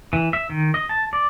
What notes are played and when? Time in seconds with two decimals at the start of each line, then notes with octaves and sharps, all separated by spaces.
0.13 E3
0.33 E5
0.50 D#3
0.74 D#5
0.89 A5
1.13 D5